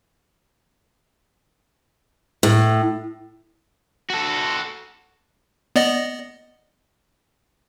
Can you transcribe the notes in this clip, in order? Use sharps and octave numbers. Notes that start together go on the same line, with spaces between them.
A2
F#4 A4
B3 D5 D#5